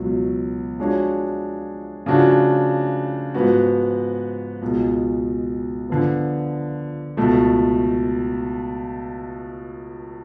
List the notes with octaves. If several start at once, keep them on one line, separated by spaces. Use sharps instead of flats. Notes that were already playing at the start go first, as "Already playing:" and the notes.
Already playing: C#2 B2 F#3
F3 G#3 D4 F#4 C#5
C#3 F3 A3 D4 F#4
G#2 F3 B3 F#4
C#2 B2 G#3
D3 F3 B3
C#2 B2 A3